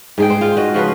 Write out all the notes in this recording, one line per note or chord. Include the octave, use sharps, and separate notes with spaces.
G#2 G#4 G5
C5
F4
F#4 D#5
C#3 F3 F#4 B4